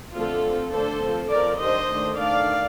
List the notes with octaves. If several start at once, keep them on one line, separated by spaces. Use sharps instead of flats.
D3 F3 A3 C4 F4 A4
F3 C4
D3 A3 D4 A4 C5
F3 C4
F3 C4 A#4 D5
D#3 G3 D4 C5 D#5
D#3 A3 D4
D#3 A3 D4 D5 F5